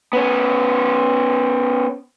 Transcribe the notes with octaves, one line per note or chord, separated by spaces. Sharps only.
B3 C#4